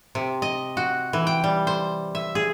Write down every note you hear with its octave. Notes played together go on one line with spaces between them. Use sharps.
C3
D#5
F#4
E3
G5
G3
C5
E5
G#4